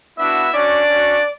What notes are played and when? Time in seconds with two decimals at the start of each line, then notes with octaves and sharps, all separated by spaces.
0.18 B3 D4 E4 F#4 E5
0.54 C#4 D4 F#4 D5
0.90 C#4 F#4